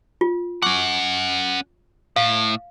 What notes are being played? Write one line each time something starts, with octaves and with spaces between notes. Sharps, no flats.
F4
C#4 F#5 C#6 D6
A2 F5